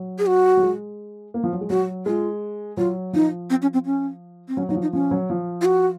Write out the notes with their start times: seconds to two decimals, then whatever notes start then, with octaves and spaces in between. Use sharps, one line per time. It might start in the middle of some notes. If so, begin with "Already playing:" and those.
Already playing: F#3
0.19 G#4
0.26 F#4
0.57 F#3
0.62 G#3
1.34 A#3
1.44 F3
1.52 F#3
1.61 G#3
1.70 F#3 F#4
2.06 G#3 F4
2.77 F#3 F4
3.13 F3 D#4
3.50 C4
3.62 C#4
3.73 C4
3.85 C#4
4.48 C4
4.57 F#3 C#4
4.69 F#3 D#4
4.75 F3
4.82 D#4
4.93 F3 C#4
5.11 F#3
5.30 F3
5.62 F4
5.65 F#4